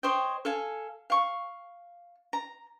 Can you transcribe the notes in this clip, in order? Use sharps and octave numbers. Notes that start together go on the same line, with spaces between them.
C5 C#5 D#5 G5
A4 F5 G#5
F5 C#6
A#5